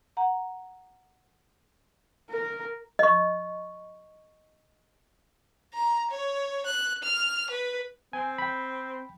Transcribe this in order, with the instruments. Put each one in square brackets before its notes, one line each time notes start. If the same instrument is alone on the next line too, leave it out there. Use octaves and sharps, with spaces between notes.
[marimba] F#5 A#5
[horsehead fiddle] A#4
[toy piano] D#5 C#6
[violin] A#5
C#5
F#6
F6
B4
[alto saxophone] C4 [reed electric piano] G#5
[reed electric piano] G5 B5